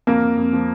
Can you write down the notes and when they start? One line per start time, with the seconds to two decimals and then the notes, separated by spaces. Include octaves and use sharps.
0.07 F2 A#3 A#4
0.22 F2
0.37 F2
0.53 F3